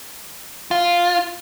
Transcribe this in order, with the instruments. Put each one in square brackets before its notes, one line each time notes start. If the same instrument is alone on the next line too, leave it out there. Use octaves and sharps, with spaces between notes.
[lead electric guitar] F4